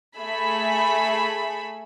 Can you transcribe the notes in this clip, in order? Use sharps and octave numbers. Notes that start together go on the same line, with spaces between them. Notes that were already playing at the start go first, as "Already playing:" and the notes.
A3 G#4 E5 B5